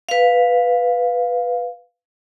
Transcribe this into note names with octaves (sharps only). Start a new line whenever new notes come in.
B4 F5